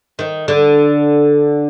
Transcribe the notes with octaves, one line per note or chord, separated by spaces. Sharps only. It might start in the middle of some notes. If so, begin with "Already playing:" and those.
D#3
D3